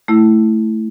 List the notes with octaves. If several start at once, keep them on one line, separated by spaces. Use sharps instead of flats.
A3 E4